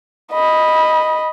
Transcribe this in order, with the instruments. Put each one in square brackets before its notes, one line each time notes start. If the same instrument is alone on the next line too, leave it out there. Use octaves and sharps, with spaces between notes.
[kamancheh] D#5 B5